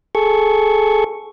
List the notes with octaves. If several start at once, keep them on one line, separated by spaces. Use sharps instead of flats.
G#4 A4 C#6